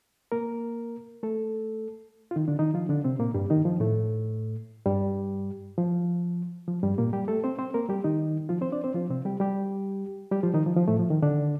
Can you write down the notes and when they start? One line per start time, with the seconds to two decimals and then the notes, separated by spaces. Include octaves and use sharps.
0.32 A#3 A#4
1.23 A3 A4
2.31 F4
2.36 D#3 D#4
2.48 D3 D4
2.59 D#3 D#4
2.74 F3 F4
2.89 D3 D4
3.04 C3 C4
3.19 A#2 A#3
3.34 G2 G3
3.50 D#3 D#4
3.65 F3
3.80 A2 A3
4.86 G2 G3
5.78 F3
6.68 F3
6.83 G2 G3
6.98 A#2 A#3
7.13 G3 G4
7.28 A3 A4
7.44 C4 C5
7.59 C4 C5
7.74 A#3 A#4
7.89 G3 G4
8.04 D#3 D#4
8.49 F3 F4
8.61 C4 C5
8.72 D4 D5
8.84 C4 C5
8.95 F3 F4
9.10 C3 C4
9.25 G3 G4
9.40 G3 G4
10.31 G3 G4
10.43 F3 F4
10.54 D#3 D#4
10.66 F3
10.77 F3
10.88 A2 A3
11.00 F3
11.10 D#3
11.22 D3 D4